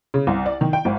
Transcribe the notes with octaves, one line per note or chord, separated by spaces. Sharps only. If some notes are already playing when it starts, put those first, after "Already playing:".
C#3
C2
D5
D#3
G5
G#1